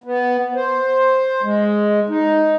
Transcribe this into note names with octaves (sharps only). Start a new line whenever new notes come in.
B3
C5
G#3
D#4